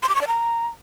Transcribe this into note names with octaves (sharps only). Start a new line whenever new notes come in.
C6
D6
C#6
D5
A#5